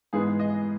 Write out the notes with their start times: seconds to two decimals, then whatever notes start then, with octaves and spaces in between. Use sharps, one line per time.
0.13 G#2 E3 G#3 B3 G#4
0.39 D#5